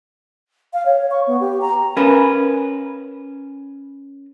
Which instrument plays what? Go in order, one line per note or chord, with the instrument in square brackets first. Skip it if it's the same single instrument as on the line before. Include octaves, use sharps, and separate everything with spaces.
[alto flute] F5
C#5
C#6
B3
G4
A#5
[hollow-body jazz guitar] C#4 A#4 B4